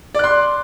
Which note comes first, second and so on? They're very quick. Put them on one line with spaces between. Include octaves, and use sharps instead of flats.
D5 F#6 C6